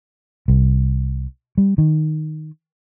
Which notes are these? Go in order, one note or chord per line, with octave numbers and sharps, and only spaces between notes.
C2
G3
D#3